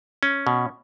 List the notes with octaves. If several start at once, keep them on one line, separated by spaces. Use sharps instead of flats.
C#4
B2